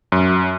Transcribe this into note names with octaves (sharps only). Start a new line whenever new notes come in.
F#2